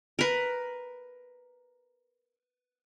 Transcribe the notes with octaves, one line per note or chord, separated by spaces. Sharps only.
A#4 B4